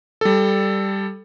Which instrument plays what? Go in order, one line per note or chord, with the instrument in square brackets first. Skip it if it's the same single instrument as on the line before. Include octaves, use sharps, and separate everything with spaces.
[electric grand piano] G3 A4